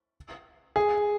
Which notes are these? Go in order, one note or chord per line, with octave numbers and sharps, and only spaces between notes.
G#4